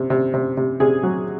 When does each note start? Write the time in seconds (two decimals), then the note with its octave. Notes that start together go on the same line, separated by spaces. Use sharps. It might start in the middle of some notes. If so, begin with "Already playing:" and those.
Already playing: C3
0.10 C3
0.34 C3
0.57 C3
0.80 C3 G#4
1.03 F#3